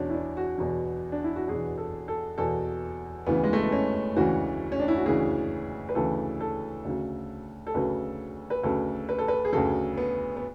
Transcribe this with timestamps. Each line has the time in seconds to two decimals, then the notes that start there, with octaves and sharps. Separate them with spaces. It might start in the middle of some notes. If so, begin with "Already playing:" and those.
Already playing: E2 B2 F#3 C#4 D4
0.10 E4
0.14 D4
0.37 F#4
0.58 E2 B2 F#3
1.12 D4
1.24 E4
1.36 F#4
1.48 E2 B2 F#3 G#4
1.78 A4
2.08 A4
2.38 E2 B2 F#3 A4
3.27 D2 C#3 E3 B3
3.44 G#3
3.53 A3
3.63 B3
3.72 C#4
4.16 D2 C#3 E3 F#4
4.72 C#4
4.80 D4
4.88 E4
4.97 F#4
5.05 D2 C#3 E3 G#4
5.89 B4
5.95 D2 C#3 E3 A4
6.41 A4
6.85 D2 C#3 F#3
7.67 A4
7.74 D2 C#3 F#3 B4
8.50 B4
8.63 D2 C#3 F#3 A4
9.09 B4
9.19 A4
9.28 B4
9.45 G#4
9.53 D2 C#3 F#3 A4
9.98 B3
10.37 B3